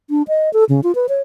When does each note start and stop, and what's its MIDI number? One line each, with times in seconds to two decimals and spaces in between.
0.10 0.23 62
0.28 0.52 75
0.53 0.64 69
0.69 0.81 49
0.83 0.94 65
0.95 1.07 71
1.09 1.21 73